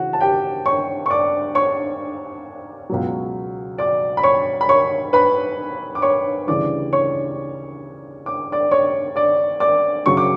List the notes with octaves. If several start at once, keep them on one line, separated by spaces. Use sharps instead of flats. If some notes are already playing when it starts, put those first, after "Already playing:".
Already playing: C#2 C#3 E3 F#4 F#5
A5
G4 G5
C#5 C#6
C#6
D5 D6
C#5 C#6
C#2 B2 F#3
D5 D6
B5
C#5 C#6
B5
C#5 C#6
B4 B5
D6
C#5 C#6
D2 C#3 E3 G3 D5 D6
C#5 C#6
D6
D5 D6
C#5 C#6
D5 D6
D5 D6
F#2 C#3 F#3 C#6
D6